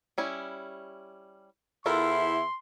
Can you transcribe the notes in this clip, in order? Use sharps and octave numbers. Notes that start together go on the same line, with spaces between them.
G3 C#4 E4
E2 E4 F4 A4 A#4 C6